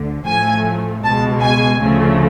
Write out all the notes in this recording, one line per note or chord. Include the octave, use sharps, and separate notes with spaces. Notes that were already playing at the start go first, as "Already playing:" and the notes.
Already playing: D2 D3
A1 A2 F3 A3 G#5
C#2 B2 G#3 A5
G#5
D2 C#3 F3 A3